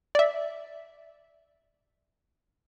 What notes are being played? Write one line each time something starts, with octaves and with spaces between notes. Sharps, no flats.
D5 E5